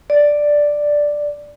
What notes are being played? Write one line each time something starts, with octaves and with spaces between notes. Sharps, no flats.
D5